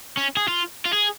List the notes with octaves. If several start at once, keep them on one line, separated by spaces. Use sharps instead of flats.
C#4
G#4
F4
F4
G#4